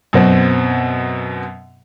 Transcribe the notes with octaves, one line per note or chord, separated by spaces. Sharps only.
F#2 B2 C4